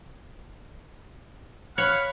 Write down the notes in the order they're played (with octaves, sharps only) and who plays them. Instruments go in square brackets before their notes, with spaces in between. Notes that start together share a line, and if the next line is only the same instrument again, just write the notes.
[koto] C#5 [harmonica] F5 F#5 B5